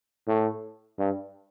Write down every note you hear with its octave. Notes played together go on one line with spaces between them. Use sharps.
A2
G2